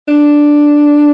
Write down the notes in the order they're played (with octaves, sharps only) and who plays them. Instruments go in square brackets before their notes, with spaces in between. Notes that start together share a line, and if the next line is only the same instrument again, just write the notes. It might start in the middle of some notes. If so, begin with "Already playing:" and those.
[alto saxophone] D4